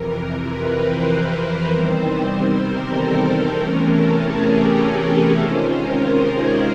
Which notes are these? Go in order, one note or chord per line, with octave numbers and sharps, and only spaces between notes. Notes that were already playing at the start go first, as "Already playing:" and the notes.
Already playing: F2 C3 E3 A#4
A#4
B4
C5
E2 C3 D#3 G3 C4
A#4
A4
A4
E2 C3 E3 A3 C#4 A#4
A4
G#4
G4
G#4
A4
C3 D#3 G#3 C#4 F4 C5
A#4
G#4